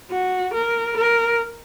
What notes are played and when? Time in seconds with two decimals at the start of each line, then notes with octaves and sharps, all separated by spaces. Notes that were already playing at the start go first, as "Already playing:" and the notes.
0.11 F#4
0.54 A#4
0.97 A#4